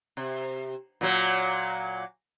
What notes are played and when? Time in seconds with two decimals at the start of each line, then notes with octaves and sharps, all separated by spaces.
0.17 C3
1.01 A#2 F#3